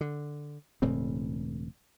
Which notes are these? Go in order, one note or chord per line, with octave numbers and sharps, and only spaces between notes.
D3
E1 A2 C#3 C4